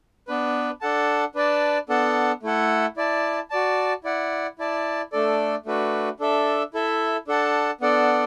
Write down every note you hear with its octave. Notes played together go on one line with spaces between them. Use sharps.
B3 D4 B4
D4 A4 F#5 A5
D4 B4 D5 A5
B3 D4 A4 F#5 A5
A3 E4 A4 F#5
E4 D5 A5
F#4 D5 A5
E4 D5 F#5
E4 D5 A5
A3 D4 A4 D5
A3 D4 F#4 B4
D4 A4 E5
E4 A4 E5
D4 A4 F#5 A5
B3 D4 A4 D5 F#5